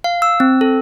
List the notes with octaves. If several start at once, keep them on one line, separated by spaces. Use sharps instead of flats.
F5
E6
C4
A4